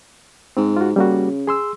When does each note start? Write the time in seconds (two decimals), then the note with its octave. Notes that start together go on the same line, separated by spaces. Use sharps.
0.57 G#2 C4
0.77 F4 F#4
0.96 C#3 G3 A#3 F#4
1.47 G#4 C6 E6